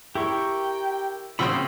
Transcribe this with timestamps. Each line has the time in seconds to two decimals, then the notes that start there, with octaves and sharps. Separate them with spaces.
0.15 E4 G4 A#4 G5 C#6
1.39 C#3 C4 F4 F#4 C5 B5 D#6 E6